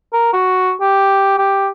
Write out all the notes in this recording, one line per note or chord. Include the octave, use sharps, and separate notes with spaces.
A#4
F#4
G4
G4